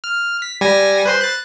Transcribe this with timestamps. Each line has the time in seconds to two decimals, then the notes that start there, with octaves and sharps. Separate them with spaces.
0.04 F6
0.42 B6
0.61 G3 G#5 A#6
1.05 B4 C5 C6
1.21 F#6 A6